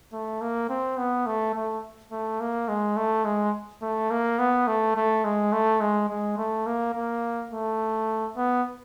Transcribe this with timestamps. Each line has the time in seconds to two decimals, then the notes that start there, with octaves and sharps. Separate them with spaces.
0.12 A3
0.41 A#3
0.69 C4
0.98 B3
1.26 A3
1.54 A3
2.11 A3
2.40 A#3
2.68 G#3
2.97 A3
3.25 G#3
3.82 A3
4.11 A#3
4.39 B3
4.68 A3
4.96 A3
5.24 G#3
5.52 A3
5.81 G#3
6.09 G#3
6.38 A3
6.66 A#3
6.94 A#3
7.52 A3
8.37 B3